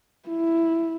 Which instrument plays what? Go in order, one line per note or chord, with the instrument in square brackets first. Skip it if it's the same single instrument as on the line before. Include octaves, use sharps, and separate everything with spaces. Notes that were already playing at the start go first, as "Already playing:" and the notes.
[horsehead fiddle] E4